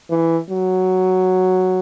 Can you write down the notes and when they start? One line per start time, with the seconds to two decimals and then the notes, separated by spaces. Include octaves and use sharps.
0.10 E3
0.50 F#3